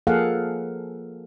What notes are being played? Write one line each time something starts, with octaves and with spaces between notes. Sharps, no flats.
F3 A#3 G#4 A4 F5 F#5